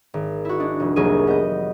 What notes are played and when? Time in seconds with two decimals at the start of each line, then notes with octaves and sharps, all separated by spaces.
0.14 G#1
0.45 E4 F#4
0.60 G#3 D4
0.80 F1
0.96 F1 C2 F#3 A#3 G#4 D#7
1.27 B3 D#5 G6